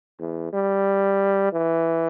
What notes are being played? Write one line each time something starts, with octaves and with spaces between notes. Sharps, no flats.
E2
G3
E3